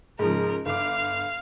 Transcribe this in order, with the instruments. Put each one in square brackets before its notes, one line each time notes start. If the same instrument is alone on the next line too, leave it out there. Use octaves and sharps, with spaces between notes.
[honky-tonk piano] G#2 C#3 F3 [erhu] A#4
[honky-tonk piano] G1 D6 [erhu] F5